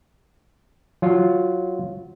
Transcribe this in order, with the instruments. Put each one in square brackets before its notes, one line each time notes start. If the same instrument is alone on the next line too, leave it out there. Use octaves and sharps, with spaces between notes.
[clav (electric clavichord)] F#3 F4